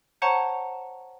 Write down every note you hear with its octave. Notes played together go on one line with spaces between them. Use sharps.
C5 C#5 F#5 A5 A#5 C#6